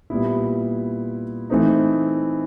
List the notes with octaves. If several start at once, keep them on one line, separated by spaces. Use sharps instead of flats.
A#2 G3 B3 E4
E3 A3 C4 D#4